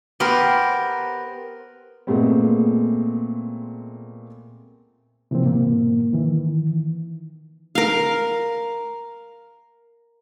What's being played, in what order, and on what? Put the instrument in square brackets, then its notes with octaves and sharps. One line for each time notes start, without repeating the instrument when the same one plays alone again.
[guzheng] B3 G4 A#4 C5
[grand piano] A#2 G#3 A3 B3 C4
[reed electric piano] C3 E3 F3 A#3 C4
G#2 B2 A#3
D#3 E3
[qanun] A#4 F5